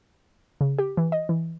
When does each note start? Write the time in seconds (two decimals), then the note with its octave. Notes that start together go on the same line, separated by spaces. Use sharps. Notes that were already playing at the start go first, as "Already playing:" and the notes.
0.61 C#3
0.79 G4
0.97 E3
1.12 D#5
1.29 E3